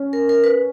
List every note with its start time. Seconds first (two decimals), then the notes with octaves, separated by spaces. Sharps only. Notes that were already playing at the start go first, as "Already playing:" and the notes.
Already playing: C#4
0.13 A#4
0.29 A#4
0.44 B4